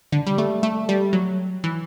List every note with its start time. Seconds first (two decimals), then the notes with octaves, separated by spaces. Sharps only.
0.12 D3
0.27 G3
0.38 A3
0.63 A3
0.89 G3
1.13 F#3
1.64 E3